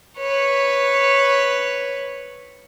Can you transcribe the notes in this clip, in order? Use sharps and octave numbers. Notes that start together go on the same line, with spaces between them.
B4 C#5